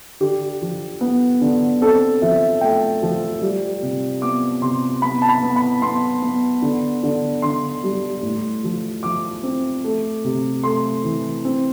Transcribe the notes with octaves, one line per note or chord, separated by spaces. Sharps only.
D3 G4
F3
B3
D3
C4 A4
F3 E5
A3 G5
F3
G3
C3
B3 D6
C3 C6
B3 B5
A5
B5
B3
B5
B3 C6
B3
D3
D3
D3 C6
G3
A2
F3
F3 D6
C4
A3
C3
A3 C6
E3
C4